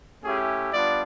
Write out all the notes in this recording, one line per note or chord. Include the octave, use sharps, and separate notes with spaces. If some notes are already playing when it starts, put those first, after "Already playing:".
A3 C#4 E4 G4 G#4
G3 B3 D4 F4 D5